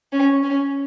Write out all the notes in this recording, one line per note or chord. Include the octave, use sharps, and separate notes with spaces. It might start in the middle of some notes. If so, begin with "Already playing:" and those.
C#4
C#4